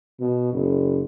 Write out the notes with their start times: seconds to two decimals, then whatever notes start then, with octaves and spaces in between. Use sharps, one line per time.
0.20 B2
0.53 F#1